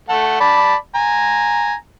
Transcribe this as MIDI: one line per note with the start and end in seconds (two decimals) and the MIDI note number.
0.09 0.36 57
0.09 0.36 69
0.09 0.36 78
0.40 0.75 74
0.40 0.75 81
0.40 0.75 83
0.95 1.73 80
0.95 1.73 82